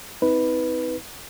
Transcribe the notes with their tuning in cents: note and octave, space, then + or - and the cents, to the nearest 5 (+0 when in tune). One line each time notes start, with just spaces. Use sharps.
C4 -20 D#4 +40 B4 +0